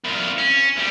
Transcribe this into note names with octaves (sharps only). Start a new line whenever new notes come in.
C2 F4
C#4
D2 G3